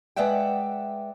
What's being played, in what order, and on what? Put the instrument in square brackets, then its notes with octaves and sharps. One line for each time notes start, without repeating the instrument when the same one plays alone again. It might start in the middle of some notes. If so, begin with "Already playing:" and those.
[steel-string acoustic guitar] G#3 B4 D5 E5 F#5 G5